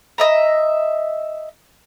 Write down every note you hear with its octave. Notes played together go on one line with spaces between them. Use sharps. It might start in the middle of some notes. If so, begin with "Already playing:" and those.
D#5 E5 A#5